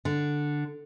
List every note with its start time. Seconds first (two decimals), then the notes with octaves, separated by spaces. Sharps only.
0.05 D3